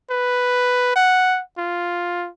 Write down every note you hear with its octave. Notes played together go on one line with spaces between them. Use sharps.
B4
F#5
F4